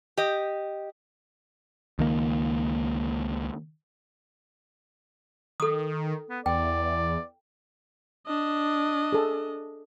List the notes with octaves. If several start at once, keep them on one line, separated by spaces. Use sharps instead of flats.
G4 D#5
C#2 D#3 A#3
D#3 A4 D#6
B3
E2 D5 G5
D4 D#5
G#4 A4